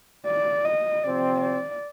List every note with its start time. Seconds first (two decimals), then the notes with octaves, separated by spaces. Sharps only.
0.26 D5
0.65 D#5
1.04 C3 F3 C4 D5
1.41 D5